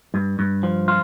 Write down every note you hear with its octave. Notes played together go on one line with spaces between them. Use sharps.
G2
G2
F3
F4